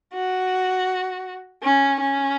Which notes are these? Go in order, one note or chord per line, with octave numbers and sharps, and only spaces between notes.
F#4
C#4
C#4